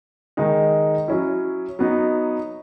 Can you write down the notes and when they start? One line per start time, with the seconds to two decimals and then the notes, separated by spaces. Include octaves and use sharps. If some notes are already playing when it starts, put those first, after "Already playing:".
0.37 D#3 G#3 D#4
1.08 F#3 C#4 E4
1.79 F#3 B3 D#4